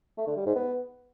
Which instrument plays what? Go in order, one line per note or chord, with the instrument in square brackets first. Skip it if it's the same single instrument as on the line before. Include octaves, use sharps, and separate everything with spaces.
[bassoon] A3
D3
G3
G#2
B3